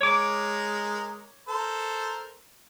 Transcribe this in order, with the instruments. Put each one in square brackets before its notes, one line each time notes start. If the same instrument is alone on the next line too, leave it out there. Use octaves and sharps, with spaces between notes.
[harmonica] G#3 A#4 [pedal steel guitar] C#5 D6
[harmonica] A4 A#4 C5